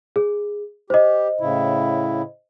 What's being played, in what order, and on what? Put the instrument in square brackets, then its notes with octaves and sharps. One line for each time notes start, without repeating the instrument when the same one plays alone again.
[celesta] G#4
[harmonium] G4 [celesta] C5 D#5
[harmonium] A2 C#3 E4